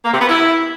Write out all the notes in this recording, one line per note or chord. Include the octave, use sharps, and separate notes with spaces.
A#3
C3
B3
E4